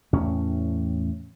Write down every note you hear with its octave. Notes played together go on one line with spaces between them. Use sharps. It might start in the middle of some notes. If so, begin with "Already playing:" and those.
E2 A2 C#4